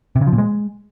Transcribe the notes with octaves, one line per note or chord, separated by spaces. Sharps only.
C3
C#3
F3
A#2
G#3